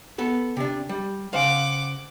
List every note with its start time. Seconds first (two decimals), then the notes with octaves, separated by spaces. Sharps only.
0.18 B3 A4 B4
0.57 C3 D4
0.89 G3
1.33 C#3 C5 F5 F#5 D6